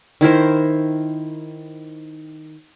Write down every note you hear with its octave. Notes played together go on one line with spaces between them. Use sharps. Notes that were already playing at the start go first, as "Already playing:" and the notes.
D#3 E4 A#4 C5